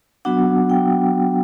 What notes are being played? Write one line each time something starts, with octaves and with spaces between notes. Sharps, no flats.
F#3 B3 D4 F#4 F#5
G5